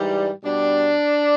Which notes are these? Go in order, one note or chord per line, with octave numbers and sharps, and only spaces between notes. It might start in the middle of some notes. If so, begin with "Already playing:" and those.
Already playing: G#2 E3 G3
B2 G3 D4